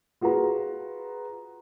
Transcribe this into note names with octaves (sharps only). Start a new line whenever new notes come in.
F4 F#4 G#4 B4 A#5